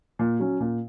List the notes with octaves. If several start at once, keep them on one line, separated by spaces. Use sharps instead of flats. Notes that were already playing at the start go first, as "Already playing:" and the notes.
A#2
F#3 C#4
A#2